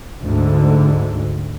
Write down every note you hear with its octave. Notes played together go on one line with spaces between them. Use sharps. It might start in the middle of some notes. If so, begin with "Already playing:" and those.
D2 G#2 D3